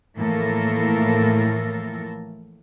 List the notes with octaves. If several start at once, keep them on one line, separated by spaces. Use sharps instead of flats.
A2 E3 F3 A#3 A4 A#4